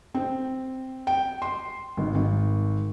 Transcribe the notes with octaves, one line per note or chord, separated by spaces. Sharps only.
C4
G5
C6
G#1
G#1